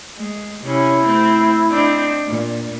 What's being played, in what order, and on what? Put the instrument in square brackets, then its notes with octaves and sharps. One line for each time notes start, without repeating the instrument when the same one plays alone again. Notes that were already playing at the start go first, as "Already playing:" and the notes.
[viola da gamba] G#3
[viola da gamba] C3 C#4 [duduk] E4
[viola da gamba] A3 C4
C4 D4 D#4
A#2